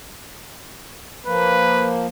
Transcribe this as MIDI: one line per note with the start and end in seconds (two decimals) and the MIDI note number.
1.26 2.07 53
1.26 2.07 58
1.26 1.93 71